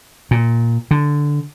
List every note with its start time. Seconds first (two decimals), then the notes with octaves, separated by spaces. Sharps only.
0.31 A#2
0.91 D3